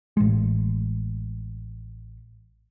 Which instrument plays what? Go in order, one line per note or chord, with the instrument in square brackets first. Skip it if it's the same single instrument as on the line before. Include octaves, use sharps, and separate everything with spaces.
[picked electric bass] A1 G#3